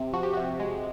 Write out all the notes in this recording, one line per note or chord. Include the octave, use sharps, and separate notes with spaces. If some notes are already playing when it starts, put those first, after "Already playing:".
Already playing: C3
F3 F#4
G4
C3 F#4
G#3